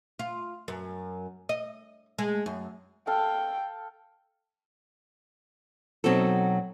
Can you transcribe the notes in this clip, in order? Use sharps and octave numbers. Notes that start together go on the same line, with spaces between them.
F4
F#2
D#5
G#3
F#2
A4 F5 G5
B2 F#3 C4 D#4 F#4 A4